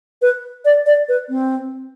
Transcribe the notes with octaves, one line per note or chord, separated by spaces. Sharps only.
B4
D5
D5
B4
C4